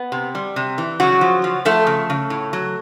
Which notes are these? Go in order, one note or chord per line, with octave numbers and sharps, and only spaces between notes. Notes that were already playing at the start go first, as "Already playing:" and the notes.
Already playing: B3
C3
G3
C3
E3
C#3 F#3 F#4
F3
F3
F3 A3 A4
C#3
C#3
A2
F#3